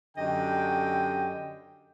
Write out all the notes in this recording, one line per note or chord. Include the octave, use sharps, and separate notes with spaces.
F#2 D3 G4 D#5 G5